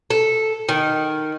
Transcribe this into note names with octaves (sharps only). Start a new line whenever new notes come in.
A4
D#3